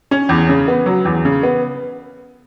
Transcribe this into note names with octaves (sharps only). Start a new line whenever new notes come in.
C#4
E2
C#3
B3
F#3
E2
C#3
B3